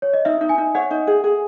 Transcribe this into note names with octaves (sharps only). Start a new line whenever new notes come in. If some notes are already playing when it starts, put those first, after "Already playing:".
C#5
D#5
D#4 E5
D#4
G#5
D#4
C#5 F#5
D#4
G#4
G#4